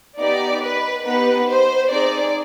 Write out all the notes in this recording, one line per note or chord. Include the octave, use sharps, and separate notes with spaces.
B3 D#4 G4 D5
B4
B3 D#4 G4 B4
C5
C4 D#4 G#4 D5